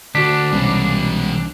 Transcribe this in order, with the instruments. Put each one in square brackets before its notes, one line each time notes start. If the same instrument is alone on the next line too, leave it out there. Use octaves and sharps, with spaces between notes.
[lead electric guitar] D2 [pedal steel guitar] D4 [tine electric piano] F#4 B6
[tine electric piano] C2 C#4 [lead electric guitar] B2 E3